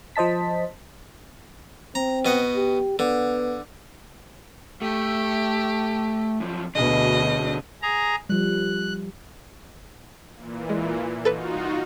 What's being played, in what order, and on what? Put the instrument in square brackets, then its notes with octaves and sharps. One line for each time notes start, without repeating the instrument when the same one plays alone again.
[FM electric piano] F3 C5 D#5 A5 B6
[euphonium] C4 [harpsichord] A#5
[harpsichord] B2 D#5 F#5
[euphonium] G4
[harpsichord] D3 [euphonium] B3
[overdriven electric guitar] A3 [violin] G4
[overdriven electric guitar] F#2 F3
[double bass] D2 B2 [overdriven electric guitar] D3 G#4 [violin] D#5
[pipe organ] G#4 A#5
[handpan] F3 G3 [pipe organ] F#6
[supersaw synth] A#2 E3
[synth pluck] G#3
[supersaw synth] D#4 F4 F#4 [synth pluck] A4 B4
[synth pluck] C2